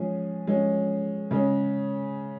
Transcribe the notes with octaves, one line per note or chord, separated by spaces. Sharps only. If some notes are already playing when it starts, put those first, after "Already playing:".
Already playing: F3 G#3 C#4 G#4
F3 G#3 C#4
C#3 G#3 C#4